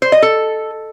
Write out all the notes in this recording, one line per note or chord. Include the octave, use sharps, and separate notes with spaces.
C5
D#5
A4